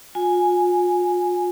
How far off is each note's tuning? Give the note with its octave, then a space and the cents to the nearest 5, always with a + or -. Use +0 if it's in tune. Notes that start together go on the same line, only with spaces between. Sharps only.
F4 +35 G#5 +0